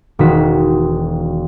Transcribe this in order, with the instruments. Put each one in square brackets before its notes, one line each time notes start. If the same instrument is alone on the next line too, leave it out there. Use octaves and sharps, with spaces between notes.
[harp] E1 D#3 D#4 F#4 B6